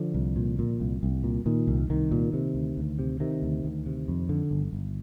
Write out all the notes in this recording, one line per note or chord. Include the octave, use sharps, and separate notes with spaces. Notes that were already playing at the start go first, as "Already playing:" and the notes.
Already playing: D3 F3
C2
A#2
A#2
C2
C2
A#2
A#2 D#3
C2
C2 D#3
A#2
C3
D2
D2
C3
C3 D#3
D2
D2
C3
F2
D3
G1
G1